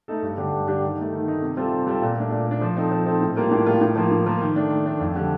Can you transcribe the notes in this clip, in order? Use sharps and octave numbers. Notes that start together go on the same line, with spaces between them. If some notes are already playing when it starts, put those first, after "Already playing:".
A3 D#4 A4
G2
D3 G3 D4 G4
G2
D3 G3 D4 G4
D#3
A3 D#4
D#3
A3 D#4
C3
G3 C4 F4 A4
C3
G3 C4 F4 A4
A#2
A3 D4
A#2
A3 D4
F3
C4 D#4 A4
F3
C4 D#4 A4
A2
G3 A#3 F4
A2
G3 A#3 F4
A2
F3 A#3 F4
A2
F3 A#3 F4
D#3
A3 D4
D#3
A3 D4
F2
D3 G3